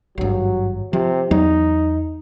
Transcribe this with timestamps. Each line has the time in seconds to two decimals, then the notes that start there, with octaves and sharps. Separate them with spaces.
0.18 G#1 G2 F#3
0.93 C3 F3
1.31 E2 F#3 D#4